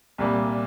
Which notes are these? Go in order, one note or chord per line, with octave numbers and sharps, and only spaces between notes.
C2 A#2 G3